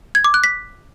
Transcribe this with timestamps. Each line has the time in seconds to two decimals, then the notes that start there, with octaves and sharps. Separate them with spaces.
0.15 G#6
0.24 D6
0.34 F#6
0.44 B6